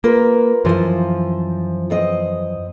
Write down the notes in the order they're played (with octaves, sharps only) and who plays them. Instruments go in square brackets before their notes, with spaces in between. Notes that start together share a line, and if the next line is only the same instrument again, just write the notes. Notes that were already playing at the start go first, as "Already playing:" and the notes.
[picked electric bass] A#3 [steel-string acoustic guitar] F4 A#4 B4
[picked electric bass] F#2 E3 F3 [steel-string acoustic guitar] F4 C5
[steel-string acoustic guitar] E2 C4 D#5